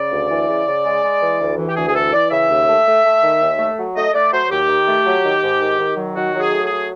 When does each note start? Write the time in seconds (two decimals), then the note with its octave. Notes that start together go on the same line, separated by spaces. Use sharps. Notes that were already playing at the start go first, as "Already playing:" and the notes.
Already playing: C#3 D5
0.11 D2
0.29 E3
0.48 C#3
0.66 C#3
0.84 G#3
1.03 G#3
1.22 E3
1.39 D2
1.58 E3
1.67 G4
1.76 D2 G#4
1.87 G#4
1.94 E3 A4
2.13 E3 D5
2.31 C#3 E5
2.49 D#2
2.68 A3
2.86 A3
3.04 A3
3.22 D#3
3.40 D#2
3.59 A3
3.78 F#3
3.96 A3 D#5
4.14 A3 D5
4.32 F#3 C5
4.51 D#2 G4
4.69 D#3
4.88 A3
5.06 F#3
5.24 D#3
5.42 G#2
5.60 D#3
5.78 D#3
5.97 F#3
6.16 D#3 F#4
6.34 F#3
6.40 G#4
6.52 A3
6.64 G#4
6.71 F#3